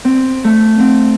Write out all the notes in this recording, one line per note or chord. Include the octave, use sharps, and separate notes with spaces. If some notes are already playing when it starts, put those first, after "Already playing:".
C4
A3
C4